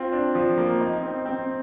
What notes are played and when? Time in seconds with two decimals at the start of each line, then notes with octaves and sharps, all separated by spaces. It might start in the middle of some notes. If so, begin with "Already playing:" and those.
Already playing: C4 F4
0.13 D4
0.35 F3
0.58 A#3
0.81 D#4
1.03 C4
1.26 C4